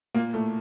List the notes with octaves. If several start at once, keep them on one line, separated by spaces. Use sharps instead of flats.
A#2 A#3
A2 A3